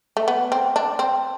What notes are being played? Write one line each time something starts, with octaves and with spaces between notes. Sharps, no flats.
A3
B3
C4
D4
C4